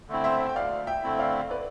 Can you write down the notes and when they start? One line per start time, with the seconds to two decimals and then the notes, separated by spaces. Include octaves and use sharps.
0.08 D3 A3 C4 E4
0.24 C5 E5
0.49 G5
0.56 D2 D5 F5
0.87 E5 G5
1.03 D3 A3 C4 E4
1.19 D5 F5
1.51 B4 D5